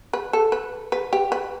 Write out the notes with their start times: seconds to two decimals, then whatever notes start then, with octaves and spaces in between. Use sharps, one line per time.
0.13 B4
0.33 A4
0.52 B4
0.92 B4
1.13 G4
1.32 B4